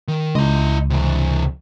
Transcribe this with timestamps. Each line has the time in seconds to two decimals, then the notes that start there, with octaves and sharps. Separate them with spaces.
0.08 D#3
0.35 C#2 E4 D#5
0.90 C3 E3